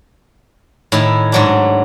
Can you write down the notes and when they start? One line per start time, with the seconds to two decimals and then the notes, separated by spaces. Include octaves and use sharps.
0.92 A2 D#3 E4
1.32 G#2 F#3 D4